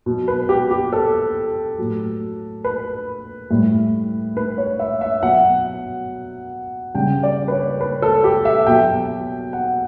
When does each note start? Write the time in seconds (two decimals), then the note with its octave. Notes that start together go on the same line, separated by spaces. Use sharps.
0.06 B2 F#3
0.28 B4
0.49 G4
0.71 G4
0.93 A4
1.78 A2 F#3
2.64 B4
3.50 A2 G3
4.37 B4
4.58 C#5
4.79 E5
5.01 E5
5.22 B2 F#3 F#5
6.94 C#3 G3 G5
7.23 D5
7.48 B4
7.52 C#5
7.81 B4
8.02 A4
8.24 G4
8.45 E5
8.67 B2 F#3 G5
9.53 F#5